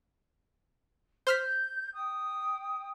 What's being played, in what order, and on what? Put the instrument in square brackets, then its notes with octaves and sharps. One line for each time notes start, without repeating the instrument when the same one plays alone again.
[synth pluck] C5 F6 B6 [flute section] G6
[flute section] G5 D#6